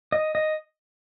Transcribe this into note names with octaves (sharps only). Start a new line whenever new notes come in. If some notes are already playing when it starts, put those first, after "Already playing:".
D#5
D#5